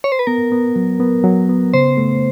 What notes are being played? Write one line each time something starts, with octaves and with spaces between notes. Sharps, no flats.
C#5
C5
B4
B3 A#4
B3
F#3
B3
F#3
B3
C#3 C5
A3